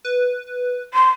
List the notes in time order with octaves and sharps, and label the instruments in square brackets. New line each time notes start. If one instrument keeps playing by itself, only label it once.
[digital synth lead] B4
[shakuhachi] C6